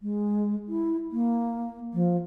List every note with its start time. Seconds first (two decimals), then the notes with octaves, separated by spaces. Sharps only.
0.02 G#3
0.68 E4
1.12 A#3
1.94 F3